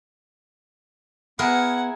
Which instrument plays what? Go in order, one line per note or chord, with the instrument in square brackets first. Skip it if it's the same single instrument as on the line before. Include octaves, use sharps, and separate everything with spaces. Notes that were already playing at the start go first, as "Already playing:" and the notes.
[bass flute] B3 [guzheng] E4 G#4 A#4 [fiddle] F#5